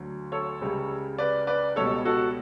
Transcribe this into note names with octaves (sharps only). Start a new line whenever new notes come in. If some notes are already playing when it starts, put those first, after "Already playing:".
Already playing: D2 D3 F#3
A4 C#5
C#2 C#3 G3
B4 D5
B4 D5
C#2 B2 G3 A4 C#5
F#4 A4